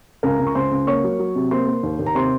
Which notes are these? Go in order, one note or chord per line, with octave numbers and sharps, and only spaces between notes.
C#2 A#4 A#5
C#2
C#6
C#2 C5 C6
C#2
A#3 C#5 C#6
F#3
F#3
C3
A#3 C5 C6
A#3
D#2
D#2
A#5
C3 C5 C6